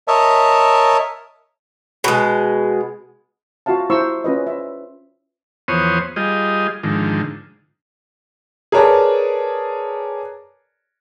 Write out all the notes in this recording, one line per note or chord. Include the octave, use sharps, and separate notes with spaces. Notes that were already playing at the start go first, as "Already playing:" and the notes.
A#4 C#5 D#5 E5 A5
B2 G#3
F4 F#4 E5 F5 A5
E4 C5 A#5 C6 C#6 E6
C#4 F4 B4 D#5
E5
E2 F3 B3 C5 C#5 D#6
G3 F4 G#4 D#5
G#2 D3 D#3 F3
G#4 A#4 B4 C#5 D5 A5